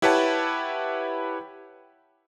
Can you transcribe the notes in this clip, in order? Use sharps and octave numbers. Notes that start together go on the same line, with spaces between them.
E4 G4 B4 C#5 F#5 A5